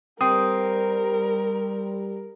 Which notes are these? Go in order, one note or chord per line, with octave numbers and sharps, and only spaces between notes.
G3 C4 A#4 D#6